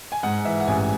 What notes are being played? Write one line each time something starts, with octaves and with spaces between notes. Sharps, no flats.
G#5
G#2 F#5
E3 E5
F#5
A1 G#5